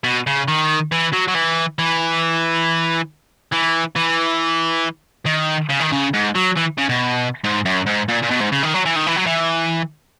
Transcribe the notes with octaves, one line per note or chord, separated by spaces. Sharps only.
B2
C#3
D#3
E3
F#3
F#3
E3
E3
E3
E3
D#3
C#3
D#3
C#3
G#2
F#3
E3
C#3
B2
G#2
F#2
G#2
A#2
A#2
B2
G#2
C#3
D#3
F#3
E3
D#3
E3
F#3
E3